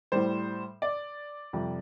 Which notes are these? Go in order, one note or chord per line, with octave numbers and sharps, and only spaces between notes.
A2 G3 C5
D5
F2 C3 G3